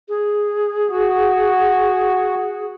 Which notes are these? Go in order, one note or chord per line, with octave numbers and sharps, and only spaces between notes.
G#4
F#4